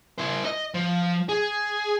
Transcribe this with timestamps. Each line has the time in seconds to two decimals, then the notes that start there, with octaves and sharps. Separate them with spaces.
0.19 E4 C5
0.45 D#5
0.74 F3
1.29 G#4